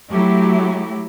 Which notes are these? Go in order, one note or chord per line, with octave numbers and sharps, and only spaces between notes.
F#3 A3 E4 G4